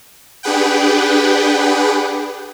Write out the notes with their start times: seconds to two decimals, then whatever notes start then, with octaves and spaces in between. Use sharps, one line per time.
0.43 D4 G4 G#4 B4 F#5 G5